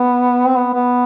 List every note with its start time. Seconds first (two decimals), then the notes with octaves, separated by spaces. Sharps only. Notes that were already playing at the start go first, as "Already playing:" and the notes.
Already playing: B3
0.48 C4
0.58 B3
0.74 B3